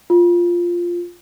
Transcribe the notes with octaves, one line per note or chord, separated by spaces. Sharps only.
F4